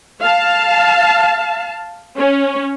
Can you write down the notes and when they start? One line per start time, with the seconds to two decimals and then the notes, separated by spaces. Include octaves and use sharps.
0.21 F5 A5
2.17 C#4